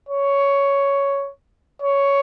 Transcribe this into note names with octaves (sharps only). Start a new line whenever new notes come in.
C#5
C#5